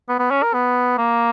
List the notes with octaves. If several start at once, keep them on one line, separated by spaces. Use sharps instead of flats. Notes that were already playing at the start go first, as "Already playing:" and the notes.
B3
B3
C#4
A#4
B3
A#3